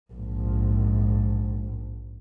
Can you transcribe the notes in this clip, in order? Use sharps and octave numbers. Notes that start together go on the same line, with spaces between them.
A#1 G#2